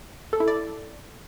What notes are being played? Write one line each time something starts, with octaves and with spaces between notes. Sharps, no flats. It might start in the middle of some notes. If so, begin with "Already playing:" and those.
A4
E4
D5